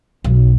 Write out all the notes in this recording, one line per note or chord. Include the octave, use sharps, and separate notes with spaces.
B1